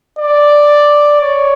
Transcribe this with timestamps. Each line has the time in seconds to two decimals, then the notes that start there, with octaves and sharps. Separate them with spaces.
0.19 D5
1.21 C#5